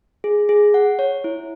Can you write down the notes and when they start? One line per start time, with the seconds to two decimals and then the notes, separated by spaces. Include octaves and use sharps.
0.24 G#4
0.49 G#4
0.74 F#5
0.99 C#5
1.24 E4